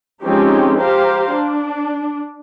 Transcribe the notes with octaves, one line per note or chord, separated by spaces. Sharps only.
F3 G#3 C4 C#4 D#4 G4
G4 C5 F5 A#5
D4